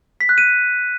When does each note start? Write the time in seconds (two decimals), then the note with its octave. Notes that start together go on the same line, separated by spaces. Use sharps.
0.21 B6
0.29 F#6
0.38 D#7